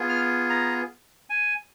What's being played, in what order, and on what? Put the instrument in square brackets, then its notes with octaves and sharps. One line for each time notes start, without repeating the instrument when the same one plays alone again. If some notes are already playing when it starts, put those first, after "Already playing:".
Already playing: [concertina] B3 F4 G#4
F6
A#5
G#5